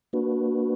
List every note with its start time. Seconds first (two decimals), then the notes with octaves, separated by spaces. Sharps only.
0.13 A#3 D4 F#4 B4